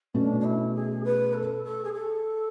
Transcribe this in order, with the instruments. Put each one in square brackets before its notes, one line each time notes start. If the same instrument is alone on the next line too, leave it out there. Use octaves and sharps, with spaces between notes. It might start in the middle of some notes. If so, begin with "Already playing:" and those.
[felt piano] B2 A3 C#4 [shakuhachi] D4
[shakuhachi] D4
E4
G#4
B4
A4
A4
G#4
A4